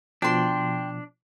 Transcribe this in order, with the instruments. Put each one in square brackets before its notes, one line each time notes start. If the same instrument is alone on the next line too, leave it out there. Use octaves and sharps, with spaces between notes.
[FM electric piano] B2 F3 [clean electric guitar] D4 [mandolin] G5 C6